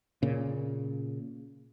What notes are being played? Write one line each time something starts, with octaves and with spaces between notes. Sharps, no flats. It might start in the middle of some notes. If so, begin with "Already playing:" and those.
A#2 C#3